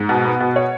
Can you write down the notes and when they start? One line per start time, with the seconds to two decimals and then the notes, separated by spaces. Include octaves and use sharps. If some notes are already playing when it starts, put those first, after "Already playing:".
Already playing: G#2
0.09 B2
0.25 B3
0.40 B2
0.56 C#5